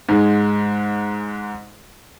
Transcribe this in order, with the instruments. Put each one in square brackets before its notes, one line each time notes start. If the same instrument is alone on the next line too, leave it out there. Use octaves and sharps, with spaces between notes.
[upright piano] G#2 G#3